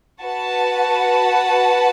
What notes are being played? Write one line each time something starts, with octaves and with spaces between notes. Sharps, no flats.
F#4 B4 F#5 A5